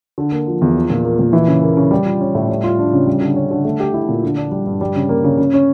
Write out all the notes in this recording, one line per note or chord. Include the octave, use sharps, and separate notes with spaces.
D3
A#3
F3
E2
F3
A#2
A#3
A#2
E3
C#3
A#3
C#3
G3
F4
C#4
A2
G3
F4
D4
C#3
G3
D3
C#4
D3
A3
G4
E4
A#2
D3
D4
G3
G2
G3
C#3
A#3
C#3
C#3
C#4